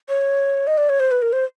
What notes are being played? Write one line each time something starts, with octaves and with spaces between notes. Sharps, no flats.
C#5
D#5
D5
C#5
C5
B4
A#4
C5